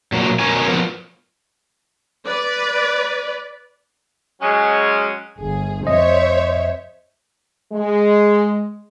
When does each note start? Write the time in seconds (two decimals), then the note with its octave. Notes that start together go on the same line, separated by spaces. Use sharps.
0.12 A#2 F#3 A#3
0.39 B2 D#3 C#4 A#4 C#5 G#5
0.67 F3 B3 F4 A#4
2.25 B4 D5
4.42 F#3 G#3 C#4
5.39 G1 G#4
5.87 F2 C5 C#5 D#5 E5
7.72 G#3